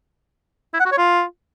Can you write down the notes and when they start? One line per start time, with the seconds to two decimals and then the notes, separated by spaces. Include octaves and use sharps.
0.74 E4
0.80 F#5
0.86 F#4
0.92 C#5
0.98 F4